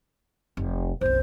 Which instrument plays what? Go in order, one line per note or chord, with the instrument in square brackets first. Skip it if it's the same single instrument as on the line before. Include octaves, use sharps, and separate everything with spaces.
[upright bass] F1
[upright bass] F#1 C2 [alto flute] C5